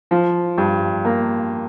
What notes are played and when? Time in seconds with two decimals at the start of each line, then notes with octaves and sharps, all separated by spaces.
0.11 F3
0.58 G2
1.05 A#3